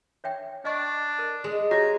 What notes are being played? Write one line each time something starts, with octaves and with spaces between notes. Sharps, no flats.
C#5 E5 G5
D4 D#5 C#6
A#4
G#3
F#4 G4 C#5 G#5 A#5